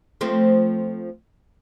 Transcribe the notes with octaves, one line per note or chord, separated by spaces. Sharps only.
F3 A3 C4